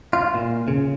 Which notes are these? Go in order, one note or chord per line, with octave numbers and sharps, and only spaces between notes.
F4
A#2
C#3